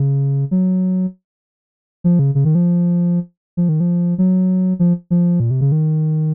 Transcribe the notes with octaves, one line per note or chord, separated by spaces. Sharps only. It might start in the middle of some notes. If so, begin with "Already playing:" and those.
Already playing: C#3
F#3
F3
C#3
C#3
D#3
F3
F3
D#3
F3
F#3
F3
F3
A#2
C3
C#3
D#3